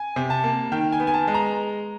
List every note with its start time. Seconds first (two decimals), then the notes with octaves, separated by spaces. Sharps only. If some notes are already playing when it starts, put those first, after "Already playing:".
Already playing: G#5
0.16 C3
0.30 A5
0.44 A#3
0.72 D#3 G5
0.92 G#5
1.00 B3
1.07 G#5
1.14 A5
1.27 G#3
1.34 A#5